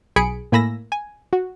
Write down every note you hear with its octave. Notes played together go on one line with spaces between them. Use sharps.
B1 G#4 G#5 B5 C#7 D7
A2 A#3 G#5 B5 E6 A#6
G#5
F#4